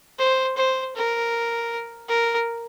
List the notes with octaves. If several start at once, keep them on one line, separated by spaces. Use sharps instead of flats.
C5
C5
A#4
A#4